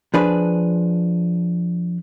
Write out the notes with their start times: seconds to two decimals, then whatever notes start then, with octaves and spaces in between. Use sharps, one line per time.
0.14 F3 D4 G#4 B4